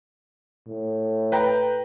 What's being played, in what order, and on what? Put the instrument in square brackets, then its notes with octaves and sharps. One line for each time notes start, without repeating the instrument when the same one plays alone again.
[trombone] A2
[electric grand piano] B4 G5 A#5